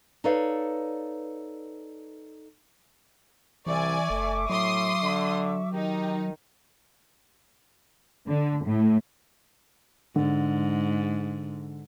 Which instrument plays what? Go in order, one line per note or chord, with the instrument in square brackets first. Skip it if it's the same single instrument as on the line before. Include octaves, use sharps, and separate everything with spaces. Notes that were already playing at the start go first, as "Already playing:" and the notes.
[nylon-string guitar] D#4 A4 B4 C#5 D5 F5
[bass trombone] C2 [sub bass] E3 [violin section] D5 G#5 [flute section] E5 C#6 D6
[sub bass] F#1 [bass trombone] A3
[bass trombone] A2 [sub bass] F#3 [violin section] C6 D#6
[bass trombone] D3
[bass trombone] D#3 [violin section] D#4 [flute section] G4
[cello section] D3
A2
[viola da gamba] G#2 [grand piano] D3